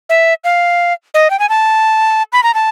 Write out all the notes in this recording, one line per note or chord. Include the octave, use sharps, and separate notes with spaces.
E5
F5
D#5
G5
G#5
A5
B5
A#5
A5